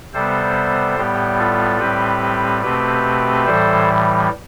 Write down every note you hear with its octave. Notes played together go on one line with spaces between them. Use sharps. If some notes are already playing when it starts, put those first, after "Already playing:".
C3 G3 B3 A4 C5
A2 G3 B3 G4
F4 A4
A2 G3 C4 G4 B4
B2 A3 C4 G4 B4
A2 E3 G3 A4 C5